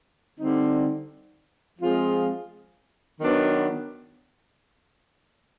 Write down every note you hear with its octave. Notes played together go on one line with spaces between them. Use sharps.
D3 G3 C4 D#4
F3 G#3 C4 F4 G#4
D#3 F#3 B3 D4